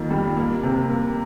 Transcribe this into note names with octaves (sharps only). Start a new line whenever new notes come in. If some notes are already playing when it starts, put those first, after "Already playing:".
Already playing: F2 D#3 A#3
G3
A#3
C3
A#3